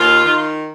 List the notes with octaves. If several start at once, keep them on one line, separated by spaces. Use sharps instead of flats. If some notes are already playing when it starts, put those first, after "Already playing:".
Already playing: D#2 F4
D#3